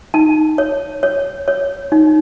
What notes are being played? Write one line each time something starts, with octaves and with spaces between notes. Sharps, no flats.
D#4 A5
C#5
C#5
C#5
D#4